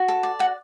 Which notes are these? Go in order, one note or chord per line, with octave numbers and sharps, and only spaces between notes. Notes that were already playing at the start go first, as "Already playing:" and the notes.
Already playing: F#4
A4
D5
F#4 F#5